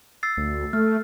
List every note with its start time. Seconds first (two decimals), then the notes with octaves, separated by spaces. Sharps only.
0.23 E6 A6 C7
0.38 D2
0.73 A3 F6